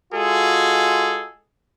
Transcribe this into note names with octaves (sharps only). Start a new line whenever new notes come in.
G#3 F4 F#4 G#4 A4